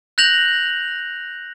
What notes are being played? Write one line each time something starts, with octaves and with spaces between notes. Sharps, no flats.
F#6 G6 A#6 F7 F#7